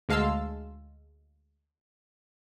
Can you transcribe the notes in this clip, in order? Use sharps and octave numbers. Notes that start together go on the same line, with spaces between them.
D2 G#3 F5 A5 C6 E6